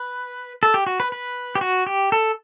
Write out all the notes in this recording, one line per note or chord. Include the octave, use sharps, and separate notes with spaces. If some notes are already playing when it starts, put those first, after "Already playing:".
Already playing: B4
A4
G4
F#4
B4
B4
G4
F#4
G4
A4